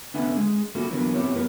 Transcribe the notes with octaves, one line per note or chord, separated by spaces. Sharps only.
D3 B3 C#4 B4 E5
G#3 G#4
A#3 C#4 E4 F#4 A4
D3 E3 F#3 B3 A#4
B3 C4 E4 G4 C#5
F#2 B3 A#4 B4